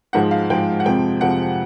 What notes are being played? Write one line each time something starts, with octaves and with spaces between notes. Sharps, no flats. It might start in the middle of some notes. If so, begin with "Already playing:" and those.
G#2 F3 G#3 F#5
F5
G#2 F3 G#3 G5
F#5
F2 C3 F3 G#3 G5
F2 C3 F3 G#3 F#5